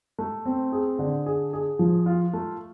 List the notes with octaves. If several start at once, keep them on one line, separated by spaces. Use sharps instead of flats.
A3
C4
G#4
D3
G#4
G#4
F3
F4
A3